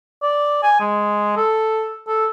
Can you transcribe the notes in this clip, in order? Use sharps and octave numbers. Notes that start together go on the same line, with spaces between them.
D5
G#5
G#3
A4
A4